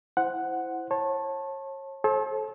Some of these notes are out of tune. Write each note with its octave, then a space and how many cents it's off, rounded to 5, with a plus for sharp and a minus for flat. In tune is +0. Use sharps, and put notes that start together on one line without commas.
E4 +0 C5 -5 F#5 +0
C#5 -35 A5 +0
A4 -30 C5 +40